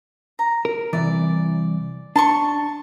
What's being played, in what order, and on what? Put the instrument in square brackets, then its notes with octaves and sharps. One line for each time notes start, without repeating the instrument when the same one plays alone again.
[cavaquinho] A#5
[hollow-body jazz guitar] A#4
[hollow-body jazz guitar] C2 F#2 E3 [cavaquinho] D5
[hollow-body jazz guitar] D4 [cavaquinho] A5 C6 C#6